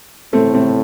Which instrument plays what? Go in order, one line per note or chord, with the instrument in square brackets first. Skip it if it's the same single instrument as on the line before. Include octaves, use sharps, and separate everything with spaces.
[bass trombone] A2 [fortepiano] A3 C4
[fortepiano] A3 C4